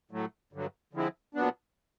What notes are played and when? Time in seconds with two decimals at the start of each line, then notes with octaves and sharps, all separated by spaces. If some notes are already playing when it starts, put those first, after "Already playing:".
0.11 A2 F#3 A3
0.53 G2 D3 F#3
0.93 D3 F3 G#3 C4 E4
1.35 A#2 F#3 B3 D4